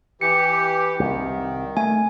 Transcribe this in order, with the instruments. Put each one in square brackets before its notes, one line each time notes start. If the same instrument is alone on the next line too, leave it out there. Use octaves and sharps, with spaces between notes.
[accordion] E3 G4 [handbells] C#7
[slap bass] C2 [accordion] D#3
[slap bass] A3 [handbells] G#5